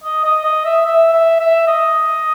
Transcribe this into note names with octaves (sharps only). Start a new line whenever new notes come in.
D#5
D#5
D#5
E5
E5
E5
E5
D#5